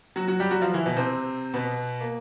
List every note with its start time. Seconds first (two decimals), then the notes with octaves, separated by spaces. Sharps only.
0.16 F#3 F#4
0.28 F#3 F#4
0.40 G3 G4
0.51 F#3 F#4
0.62 F3 F4
0.74 E3 E4
0.86 B2 B3
0.97 C3 C4
1.54 B2 B3
2.00 A#3